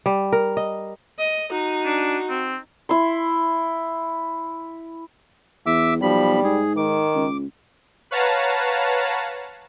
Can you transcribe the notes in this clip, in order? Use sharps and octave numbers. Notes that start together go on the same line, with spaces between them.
G3
A#4
D#5
D#5
D#4 F#4
D4
C4
E4 C6
E2 E5 D6 E6
B1 F3 G3 B5
G#2 G#4
D#3 D6
C#2
B4 C#5 F5 F#5 A5 A#5